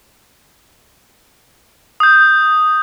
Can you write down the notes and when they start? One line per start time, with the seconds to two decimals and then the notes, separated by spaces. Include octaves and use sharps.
2.00 D#6 G6